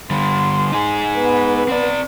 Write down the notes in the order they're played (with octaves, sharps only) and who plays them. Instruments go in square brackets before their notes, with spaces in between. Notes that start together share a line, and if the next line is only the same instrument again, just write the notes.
[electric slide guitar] D3 G3 [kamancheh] C6
[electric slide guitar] D#4 G#4
[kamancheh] B3 B4
[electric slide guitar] C4 D5